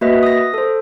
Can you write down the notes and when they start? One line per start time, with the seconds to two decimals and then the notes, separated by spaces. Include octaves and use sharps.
0.01 A#3 F#4 B4 D#5 E5
0.23 D#6 A#6
0.54 A4 C5